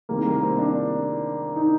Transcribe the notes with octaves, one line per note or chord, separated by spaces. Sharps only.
C2 C3 D#3 G3 A#3
A#3
C4
D4
D#4